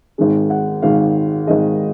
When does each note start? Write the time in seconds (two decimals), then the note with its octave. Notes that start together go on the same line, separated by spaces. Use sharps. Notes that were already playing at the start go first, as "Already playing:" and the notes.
0.18 G#1 G#2 D#3 G#3
0.50 F#5
0.82 G#1 G#2 D#3 G#3 F5
1.47 G#1 G#2 D#3 G#3 D#5